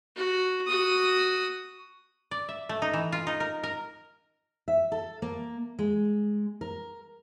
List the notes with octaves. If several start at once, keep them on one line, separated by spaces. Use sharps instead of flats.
F#4
F#4 D#6
D5
E5
A3
D#4
E3
F4
D#4
A#4
A#4
E5
A4
A#3
G#3
A#4